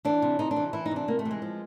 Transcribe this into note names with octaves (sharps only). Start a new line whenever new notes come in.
E3 D4
C3
C3 D#4
D4
E3
E3 E4
D#4
C3 D4
C3 A#3
A3
E3
G#3
F3